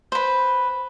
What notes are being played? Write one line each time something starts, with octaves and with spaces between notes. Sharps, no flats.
B4 C5